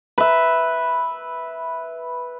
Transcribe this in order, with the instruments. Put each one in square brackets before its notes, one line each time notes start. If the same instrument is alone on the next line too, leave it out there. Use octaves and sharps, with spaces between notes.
[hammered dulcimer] B4 E5